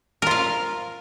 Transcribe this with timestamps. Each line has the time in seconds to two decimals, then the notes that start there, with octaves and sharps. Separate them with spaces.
0.22 A#4
0.27 F4
0.31 F5